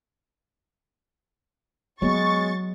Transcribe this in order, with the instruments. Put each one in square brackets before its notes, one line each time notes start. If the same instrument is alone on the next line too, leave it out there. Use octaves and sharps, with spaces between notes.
[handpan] F#3 [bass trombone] G#3 [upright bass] B3 [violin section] C#6 A6